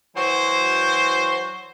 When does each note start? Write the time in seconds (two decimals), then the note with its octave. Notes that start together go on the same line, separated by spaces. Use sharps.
0.16 E3 F#3 F#4 C5